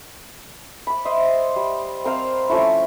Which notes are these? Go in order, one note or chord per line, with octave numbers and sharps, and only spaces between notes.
B5 D6
C5 D#5 E5
G3
C4 A#4 C5 F5
F3 A3 C#4 E4